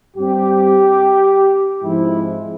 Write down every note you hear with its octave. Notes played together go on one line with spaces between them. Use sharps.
G2 G3 C4 G4
G#2 F3 G#3 C4 E4